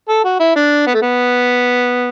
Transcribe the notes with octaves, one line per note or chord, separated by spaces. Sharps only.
A4
F#4
E4
D4
B3
A3
B3